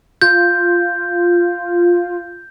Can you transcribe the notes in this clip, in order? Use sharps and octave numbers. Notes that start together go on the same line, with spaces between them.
F4 G6